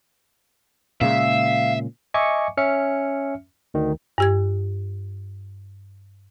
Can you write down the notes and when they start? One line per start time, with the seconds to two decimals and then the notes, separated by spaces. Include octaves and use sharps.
1.01 A#2 C#3 G#3 E5 F5
2.14 D#5 E5 G#5 C#6 D6 C#7
2.57 C#4 E5 F6 C#7
3.74 D2 D#3
4.18 G2 G4 G#6